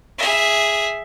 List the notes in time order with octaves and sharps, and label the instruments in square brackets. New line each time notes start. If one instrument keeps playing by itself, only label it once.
[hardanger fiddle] G#4 E5